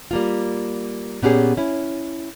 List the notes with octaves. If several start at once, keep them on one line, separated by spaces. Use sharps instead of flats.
G3 A#3 F4
A#2 B3 C#4 G4 G#4
C#4 E4